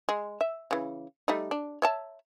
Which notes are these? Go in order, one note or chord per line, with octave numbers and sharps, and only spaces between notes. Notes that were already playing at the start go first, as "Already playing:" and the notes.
G#3
E5
C#3 E3
G3 A3 D#4
D4
C#5 E5 A5